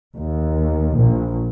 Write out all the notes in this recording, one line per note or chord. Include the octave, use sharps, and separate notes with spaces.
D#2
A#1